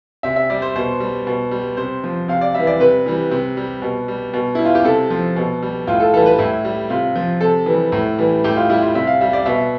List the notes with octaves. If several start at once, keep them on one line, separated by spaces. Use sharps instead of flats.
C3 E5
E5
G3 D5
C5
B2 C5
G3
B2
G3
C3 C5
F3
C3 F5
D5
E3 G3 E5
D5
C3 B4
E3 G3
C3
G3
B2
G3
B2
G3 E4
F4
G4
C3 A4
F3
B2
G3
A2 F4
A4
E3 G3 A4
B4
A2 E4
G3
C3 F4
F3
C3 A4
E3 G3
A2
E3 G3
A2 G4
F4
G3 E4
F4
C3 E5
F5
G3 E5
D5
B2 E5